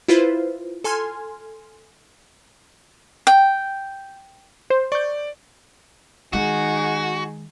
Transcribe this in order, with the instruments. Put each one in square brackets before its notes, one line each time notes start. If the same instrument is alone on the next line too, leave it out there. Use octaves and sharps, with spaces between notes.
[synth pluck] E4 F4 B4 C5
A4 G#5 C6 F6 G#6
[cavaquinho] G5
[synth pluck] C5
[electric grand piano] D5 [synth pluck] C#6 G6
[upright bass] D#3 G#3 [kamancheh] D#4 G#4 [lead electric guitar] F#4